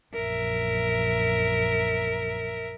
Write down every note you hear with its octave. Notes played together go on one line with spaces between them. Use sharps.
A#1 F#2 A#4 E5